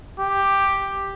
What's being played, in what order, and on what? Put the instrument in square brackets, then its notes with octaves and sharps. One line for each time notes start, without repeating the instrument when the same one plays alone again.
[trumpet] G4